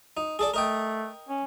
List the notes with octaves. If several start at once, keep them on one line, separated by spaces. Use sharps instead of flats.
D#4
G#4 A4 D5
A3 A#4 D#5 G5
C#4